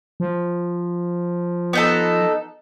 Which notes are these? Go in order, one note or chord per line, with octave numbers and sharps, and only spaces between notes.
F3
B3 D#4 A4